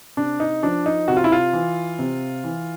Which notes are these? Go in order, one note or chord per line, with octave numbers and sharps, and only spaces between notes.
C3 D4
D#4
F3 D4
D#4
C3 F#4
F4
E4
F4
E3
C3
E3